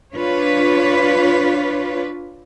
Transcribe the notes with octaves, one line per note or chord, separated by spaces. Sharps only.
D4 F4 B4 C#5